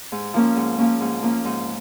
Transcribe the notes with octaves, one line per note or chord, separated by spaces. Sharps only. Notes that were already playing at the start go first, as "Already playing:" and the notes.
G#2
F3 A#3 C#4
G#2
F3 A#3 C#4
G#2
F3 A#3 C#4
G#2